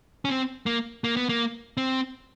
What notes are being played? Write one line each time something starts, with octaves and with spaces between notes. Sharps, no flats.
C#4
C4
A#3
A#3
B3
A#3
C4